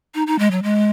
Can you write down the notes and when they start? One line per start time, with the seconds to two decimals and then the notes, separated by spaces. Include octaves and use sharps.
0.14 D#4
0.27 D#4
0.39 G#3
0.51 F#3
0.63 G#3